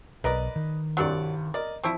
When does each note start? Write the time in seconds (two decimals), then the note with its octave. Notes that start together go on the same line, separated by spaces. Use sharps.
0.24 B1 A#4 B4 D5 D#5
0.56 D#3
0.97 C2 G2 F#3 A4 D5 F#5
1.54 A#4 D5 D#5
1.84 F3 C4 E4 C#6